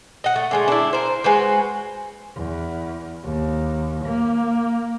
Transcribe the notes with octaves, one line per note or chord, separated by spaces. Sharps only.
D#5 F#5
A3
D3 G#3 A3
D4 E4
A#4 C5
G#3 F#4 B4 C5
E2
D#2
A#3